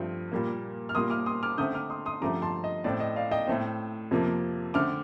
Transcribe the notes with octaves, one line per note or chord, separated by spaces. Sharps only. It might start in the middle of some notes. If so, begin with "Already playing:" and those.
Already playing: G2 F3 A3 C4
A#2 G3 A#3
F6
A#2 G3 A#3 C6 D#6
D6 F6
C6 D#6
D6 F6
D3 A3 C4 D#6 G6
D6 F6
C6 D#6
C6 D#6
G2 D3 F3 A3 C4 A#5 D6
A5 C6
D#5
A2 A3 C4 D5
D#5
D5 F5
D#5 G5
A2 A3 C4
F2 C3 F3 A#3
D3 A3 C4 D6 F6